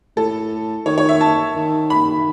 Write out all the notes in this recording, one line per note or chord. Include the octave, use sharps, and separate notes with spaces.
A2 A4
D#3 C#5
C#5
E5
A5
D#3
B5